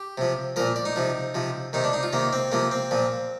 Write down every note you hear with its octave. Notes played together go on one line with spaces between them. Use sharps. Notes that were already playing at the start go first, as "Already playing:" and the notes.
Already playing: G4
C3 F3
A#2 F3 A#4
D5
D#4
C3 F3
C3 F3
C3 D#3 D#4
D4
D#4
F4
C3 D#3 A#3
C4
C3 F3 A#3
C4
A#2 F3